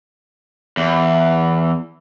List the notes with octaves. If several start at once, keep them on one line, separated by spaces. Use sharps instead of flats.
E2